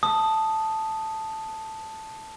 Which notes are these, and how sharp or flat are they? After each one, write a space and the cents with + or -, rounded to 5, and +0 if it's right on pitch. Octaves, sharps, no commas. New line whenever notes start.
A5 +0 D#6 +0